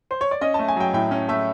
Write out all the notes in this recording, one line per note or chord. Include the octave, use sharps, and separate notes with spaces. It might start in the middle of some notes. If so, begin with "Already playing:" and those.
C5
C#5
D5
C#4 D#5
A3 A5
G#5
F#3 G5
A2 G5
C#4
A3 E5